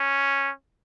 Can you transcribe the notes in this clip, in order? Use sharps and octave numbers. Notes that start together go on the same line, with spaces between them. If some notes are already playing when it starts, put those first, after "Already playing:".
Already playing: C#4